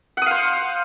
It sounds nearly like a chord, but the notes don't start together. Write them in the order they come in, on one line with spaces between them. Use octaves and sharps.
F#5 D#6 F5 C5